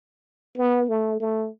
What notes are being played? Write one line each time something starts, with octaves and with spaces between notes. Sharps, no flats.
B3
A3
A3